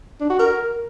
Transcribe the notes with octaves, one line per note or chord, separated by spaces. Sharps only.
D4
F#4
A#4